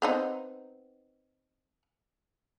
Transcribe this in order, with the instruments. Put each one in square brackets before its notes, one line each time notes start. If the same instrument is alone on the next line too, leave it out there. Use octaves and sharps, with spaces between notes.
[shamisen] B3 C4 D#4